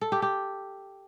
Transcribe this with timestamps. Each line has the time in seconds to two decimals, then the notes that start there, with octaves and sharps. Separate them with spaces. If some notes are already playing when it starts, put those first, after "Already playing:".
0.01 A4
0.12 G4
0.22 G4